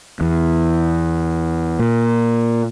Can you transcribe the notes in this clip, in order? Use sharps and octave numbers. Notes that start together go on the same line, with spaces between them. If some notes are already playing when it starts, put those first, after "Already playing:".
E2
A#2